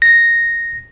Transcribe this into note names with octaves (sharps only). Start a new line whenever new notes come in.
A#6